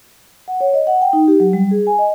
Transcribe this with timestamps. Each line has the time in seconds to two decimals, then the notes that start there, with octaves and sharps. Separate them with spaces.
0.48 F#5
0.61 C#5
0.74 D#5
0.87 F#5
1.02 G5
1.13 D#4
1.28 G4
1.40 F#3
1.53 G3
1.71 G#4
1.87 G#5
1.99 D#5